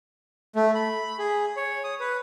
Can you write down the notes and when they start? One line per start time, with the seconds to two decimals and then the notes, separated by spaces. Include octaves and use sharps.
0.56 A3
0.75 B5
1.19 G#4
1.57 C#5
1.84 D#6
2.00 B4